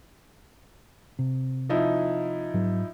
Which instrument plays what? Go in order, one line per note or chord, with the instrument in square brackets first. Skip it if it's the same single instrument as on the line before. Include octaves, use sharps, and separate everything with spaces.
[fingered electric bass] C3
[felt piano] F3 D#4 E4
[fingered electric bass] G#2 F#3